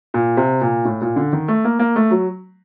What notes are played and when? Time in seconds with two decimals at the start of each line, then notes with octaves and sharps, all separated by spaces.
0.14 A#2
0.37 C3
0.61 A#2
0.85 A2
1.01 A#2
1.16 D3
1.33 D#3
1.48 A3
1.64 A#3
1.79 A#3
1.96 A3
2.11 F#3